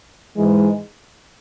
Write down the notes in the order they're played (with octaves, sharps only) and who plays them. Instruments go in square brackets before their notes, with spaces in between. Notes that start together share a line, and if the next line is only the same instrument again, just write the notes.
[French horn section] G#2 E3 G#3